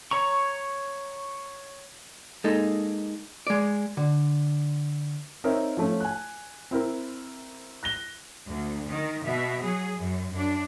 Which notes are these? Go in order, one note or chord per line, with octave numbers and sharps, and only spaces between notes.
C#5 A#5 C#6
G#3 A#3 D#4 A4
G#3 D5
D3
C4 D#4 A#4 C#5 E5
F3 A3 C#4
G#5 F#6
C4 E4 A#4
F#6 A#6 G7
D2
D#3
B2 E5
F#3 G#4
F#2
F#2 D4